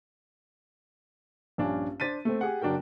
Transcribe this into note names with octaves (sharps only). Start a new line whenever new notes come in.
A#1 G2 C#4 D4
D4 C5 A6 B6 D#7
A3 C4
G4 G#4 F#5
F#1 D4 F#4 A#4 G5